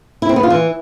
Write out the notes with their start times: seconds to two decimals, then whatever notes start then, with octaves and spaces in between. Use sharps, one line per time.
0.22 E4
0.29 C4
0.36 B3
0.43 F4
0.50 E3